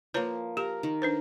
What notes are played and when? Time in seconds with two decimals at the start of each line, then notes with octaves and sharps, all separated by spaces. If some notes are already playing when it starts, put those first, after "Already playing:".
0.14 F3 A#3 B4 C#5 A#5
0.57 G4 A#4
0.83 D#3
1.02 D4 B4 C5